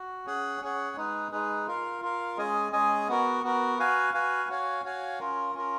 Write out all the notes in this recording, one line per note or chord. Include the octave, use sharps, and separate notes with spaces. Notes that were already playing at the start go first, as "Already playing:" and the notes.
Already playing: F#4
C#4 G#4 C#5 F#5
C#4 G#4 C#5 F#5
G#3 D#4 G#4 B4
G#3 D#4 G#4 B4
F4 A#4 F5
F4 A#4 F5
G#3 C#4 G#4 D#5 G#5
G#3 C#4 G#4 D#5 G#5
B3 F#4 A#4
B3 F#4 A#4
F#4 B4 F5 G#5
F#4 B4 F5 G#5
F#4 C#5 F5 G#5
F#4 C#5 F5 G#5
C#4 F4 A#4
C#4 F4 A#4